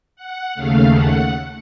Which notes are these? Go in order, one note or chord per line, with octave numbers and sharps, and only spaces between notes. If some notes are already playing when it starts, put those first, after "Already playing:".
F#5
D#2 C#3 A3 F5
F#5